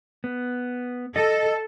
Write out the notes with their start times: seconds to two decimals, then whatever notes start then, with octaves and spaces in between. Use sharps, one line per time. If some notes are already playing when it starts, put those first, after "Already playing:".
0.24 B3
1.16 A4 D#5